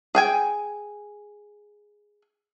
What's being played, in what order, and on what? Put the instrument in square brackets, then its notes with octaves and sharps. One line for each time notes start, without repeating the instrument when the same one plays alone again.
[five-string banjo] G#4 G5 G#5